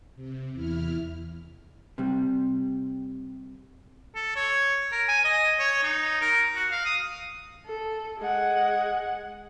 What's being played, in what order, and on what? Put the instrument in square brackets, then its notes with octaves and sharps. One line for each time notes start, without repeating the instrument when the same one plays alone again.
[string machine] C3
E2 E4 F6
[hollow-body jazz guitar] C3 G3
[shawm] A4
C#5
A#4
G#5
D#5
C#5
D#4
A#4
F#4
F5
D#6
[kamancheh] A4
G#3 F#5